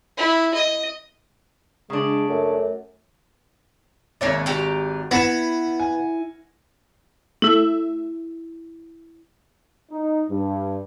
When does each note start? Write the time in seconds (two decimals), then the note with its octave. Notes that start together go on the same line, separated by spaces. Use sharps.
0.18 E4
0.54 D#5
1.90 C#3 G#3 D4
2.29 F#2 A3
4.21 G#1 A#3 C#5 D5 E5
4.46 F#4 G4 A#5
5.11 B3 E4 A#6 C#7 E7
5.80 G#5
7.42 A3 E4 E5
9.92 D#4
10.29 G2